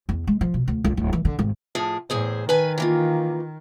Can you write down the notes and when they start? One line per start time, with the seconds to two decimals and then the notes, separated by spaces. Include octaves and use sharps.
0.09 E2
0.27 G#3
0.41 F3
0.54 B2
0.68 D2
0.84 C#2
0.97 D1
1.13 E3
1.25 D3
1.39 G#1
1.75 A2 F3 G#4
2.10 E2 A2 G#4 C5
2.49 D#3 B4 G#5
2.78 E3 A#3 F4